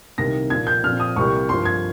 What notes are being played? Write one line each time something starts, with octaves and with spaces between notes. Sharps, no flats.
C2 C3 D#3 A#3 A#6
A#2 F3 A#3 G#6
G6
A#2 F3 C4 F6
D#6
C2 C3 G3 A#3 C#6
G2 F3 A#3 C6
G#6